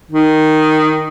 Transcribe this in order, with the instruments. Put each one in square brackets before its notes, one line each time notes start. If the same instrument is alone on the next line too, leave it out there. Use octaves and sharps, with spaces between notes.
[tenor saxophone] D#3